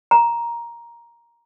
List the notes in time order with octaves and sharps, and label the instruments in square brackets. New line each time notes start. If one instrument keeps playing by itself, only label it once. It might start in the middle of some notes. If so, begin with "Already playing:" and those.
[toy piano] A#5